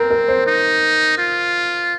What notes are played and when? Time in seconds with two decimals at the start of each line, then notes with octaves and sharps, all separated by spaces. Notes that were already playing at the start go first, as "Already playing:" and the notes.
Already playing: C4 A#4
0.11 A#4
0.28 C5
0.47 D#4
1.18 F4